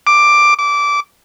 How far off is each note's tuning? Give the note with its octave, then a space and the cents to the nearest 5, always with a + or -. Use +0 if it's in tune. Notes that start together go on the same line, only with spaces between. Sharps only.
D6 +10
D6 -15